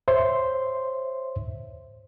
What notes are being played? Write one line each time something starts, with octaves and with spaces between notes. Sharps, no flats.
C5 C#5 E5 C6